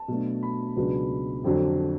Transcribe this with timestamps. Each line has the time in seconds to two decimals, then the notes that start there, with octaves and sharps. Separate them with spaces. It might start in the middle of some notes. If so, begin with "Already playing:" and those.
Already playing: A5
0.08 B2 F#3 A3 D4
0.43 B5
0.76 C#2 B2 F#3 B3 D4
1.44 F2 D3 F#3